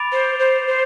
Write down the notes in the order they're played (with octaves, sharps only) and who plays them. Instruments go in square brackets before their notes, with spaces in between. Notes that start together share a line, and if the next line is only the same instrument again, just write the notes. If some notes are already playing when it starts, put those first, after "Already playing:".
Already playing: [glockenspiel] B5 D6 A6 D7 F7
[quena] C5
C5
C5